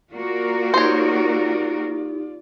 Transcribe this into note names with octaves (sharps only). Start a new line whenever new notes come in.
A#3 F4 F#4 A#4 D5
D#4 G4 C5 C#5